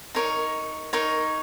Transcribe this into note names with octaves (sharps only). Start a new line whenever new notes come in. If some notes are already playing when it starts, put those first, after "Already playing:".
D#4 A#4 C#5
D#4 A#4 C#5